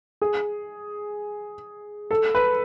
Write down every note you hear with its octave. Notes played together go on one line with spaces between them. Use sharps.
G#4
A4
B4